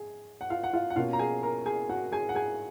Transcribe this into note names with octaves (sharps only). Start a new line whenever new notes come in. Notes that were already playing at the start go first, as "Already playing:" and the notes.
Already playing: G#4 G#5
F#5
F4 F5
F#5
F4 F5
F#5
B2 A#3 C#4 F4 F5
A#5
G#4 G#5
A#4 A#5
G#4 G#5
F#4 F#5
G#4 G#5
F#5
G#4 G#5